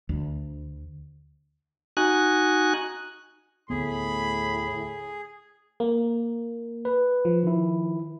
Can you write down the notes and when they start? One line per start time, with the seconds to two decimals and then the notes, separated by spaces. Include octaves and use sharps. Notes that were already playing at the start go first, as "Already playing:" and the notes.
0.09 D2
1.97 D#4 F#4 G#5 F#6
3.70 D2 A2 B3 G#4 B5
5.80 A#3
6.85 B4
7.25 F3
7.43 D#3 E4